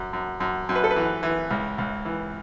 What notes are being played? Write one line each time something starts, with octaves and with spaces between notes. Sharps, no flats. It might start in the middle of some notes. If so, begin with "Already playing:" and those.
Already playing: F#2
F#2
F#2
F#2
B4
A4
B4
E3
E3
C#2
C#2
E3